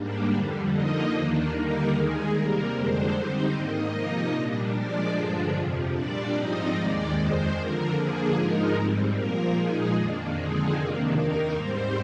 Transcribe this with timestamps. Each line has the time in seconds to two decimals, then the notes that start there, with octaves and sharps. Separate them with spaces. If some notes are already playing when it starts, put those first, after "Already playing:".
Already playing: G#2 G3 A#3 D4
0.30 F2 D3 G3
0.71 D3 F3 A#3 D#4 D#5
1.11 D#2 D#3 A#3 D4
1.51 D3 G3 A#3 D#4 A#4
1.91 D#2 D#3 G#3 G#4
2.31 C3 G3 A#3 A#4
2.71 F2 D3 G#3 D4 C5
3.11 D3 G3 C4 D#4 C5
3.51 G#2 D#3 A#3 D#5
3.91 C3 F3 A#3 D#4 D#5
4.32 A#2 G3 D4
4.72 A#2 F3 G#3 D4 D5
5.12 G2 D3 F3 G#3 D4
5.52 F2 C3 F3
5.92 A#2 G3 D4 D5
6.32 G#2 F3 C4 D#4 D#5
6.73 D#2 D#3 G#3 D#4 D5
7.13 F2 D#3 G#3 C5
7.53 F2 D3 F3 A#4
7.93 D3 F3 A#3 D4 G#4
8.33 G#2 F3 G#3 D#4 A#4
8.73 G#2 G3 C4
9.14 A#2 F3 A#3 A#4
9.54 A#2 F3 G#3 D#4 G#4
9.94 F2 D#3 A#3 D4
10.34 D3 F3 G#3 C4 D#4 G#4
10.74 F2 C3 D#3 A#3 D4
11.14 D#2 D#3 A#3 D#4 A#4
11.54 G#2 G3 C4 C5